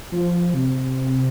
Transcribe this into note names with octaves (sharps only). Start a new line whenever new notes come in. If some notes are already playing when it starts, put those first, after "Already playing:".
F3
C3